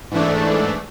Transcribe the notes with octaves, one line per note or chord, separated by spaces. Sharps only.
G#2 E3 A3 D4